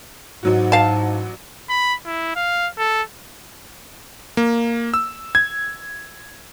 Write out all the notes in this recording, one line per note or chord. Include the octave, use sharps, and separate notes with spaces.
A1 G#2 F#3 F#4
F5 A5
B5
E4
F5
A4
A#3
E6
G#6